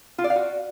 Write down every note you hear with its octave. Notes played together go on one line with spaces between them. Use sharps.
F4
D5
F5
F#4